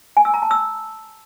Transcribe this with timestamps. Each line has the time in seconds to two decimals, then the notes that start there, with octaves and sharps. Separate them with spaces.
0.17 G#5
0.25 E6
0.34 A#5
0.42 A5
0.51 E6